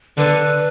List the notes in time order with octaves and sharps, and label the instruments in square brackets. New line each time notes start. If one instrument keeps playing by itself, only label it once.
[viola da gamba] D3 [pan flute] B4